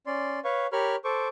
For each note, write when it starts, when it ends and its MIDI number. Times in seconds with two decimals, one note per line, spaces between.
0.07 0.39 61
0.07 0.39 74
0.07 0.39 84
0.44 0.67 71
0.44 0.67 73
0.44 0.67 77
0.44 0.67 85
0.72 0.96 67
0.72 0.96 70
0.72 0.96 73
0.72 0.96 83
0.72 0.96 85
0.72 0.96 89
1.04 1.28 69
1.04 1.28 72
1.04 1.28 85
1.04 1.28 86